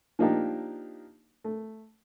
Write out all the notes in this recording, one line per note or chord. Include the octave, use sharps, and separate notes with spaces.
F3 A#3 D4 D#4 G4
A3